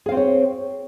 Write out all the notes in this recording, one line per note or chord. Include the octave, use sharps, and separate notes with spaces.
C4 G#4 C5 C#5 F5